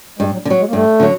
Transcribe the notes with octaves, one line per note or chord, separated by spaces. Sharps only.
G2 G#3
F#3
D3 G3
F#3
G#3
A#3
G2 A3
D3 F#3